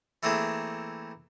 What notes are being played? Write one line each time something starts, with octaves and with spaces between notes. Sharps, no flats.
E3 A3 A#3 C4 E4 G#4